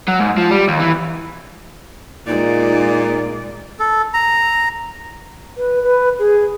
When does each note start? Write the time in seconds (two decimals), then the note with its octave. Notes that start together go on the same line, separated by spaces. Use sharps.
0.08 F#3
0.20 G#2
0.38 F3
0.51 G3
0.68 D#2
0.80 E3
2.27 A#2 G#3 D#4 D5
3.80 A4
4.14 A#5
5.57 B4
5.83 B4
6.19 G#4